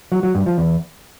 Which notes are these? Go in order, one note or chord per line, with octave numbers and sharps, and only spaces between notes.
F#3
F#3
G2
F3
E2